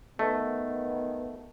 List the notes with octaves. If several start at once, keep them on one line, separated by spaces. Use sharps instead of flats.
D#3 A3 B3